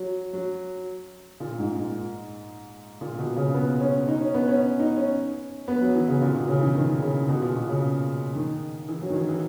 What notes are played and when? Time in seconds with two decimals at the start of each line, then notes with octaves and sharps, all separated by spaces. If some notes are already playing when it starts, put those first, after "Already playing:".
Already playing: F#3
0.33 F#3
1.40 A#2
1.59 G#2
1.76 G#2
3.01 A#2
3.18 B2
3.36 C#3
3.54 B3
3.81 C#4
4.07 D#4
4.21 C#4
4.34 B3
4.48 C#4
4.61 C#4
4.79 D#4
4.97 C#4
5.68 B3
5.81 F#3
5.95 E3
6.08 C#3
6.22 A#2
6.34 B2
6.48 C#3
6.61 E3
6.75 D#3
7.02 C#3
7.28 B2
7.42 A#2
7.55 B2
7.69 C#3
8.35 D#3
8.89 E3
9.02 F#3
9.10 D#3
9.15 E3
9.29 E3